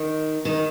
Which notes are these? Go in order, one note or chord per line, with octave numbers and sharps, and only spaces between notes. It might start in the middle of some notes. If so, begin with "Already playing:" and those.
Already playing: D#3
D#3